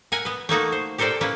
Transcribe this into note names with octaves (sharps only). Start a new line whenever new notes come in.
A#4 E5 F#5 G#5
B3 B4
A3 A#3 D#4 F#4
C5
G4 A4 A#4 C5 D5 G5
A#3 C#4 E4 B4